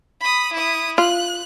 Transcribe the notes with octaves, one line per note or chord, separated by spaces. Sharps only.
B5 D#6
E4 D#6
F4 F#6